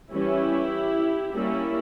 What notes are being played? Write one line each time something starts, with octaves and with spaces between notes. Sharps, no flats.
E3 G3 C#4 E4 G4
G3 A#3 C#4 E4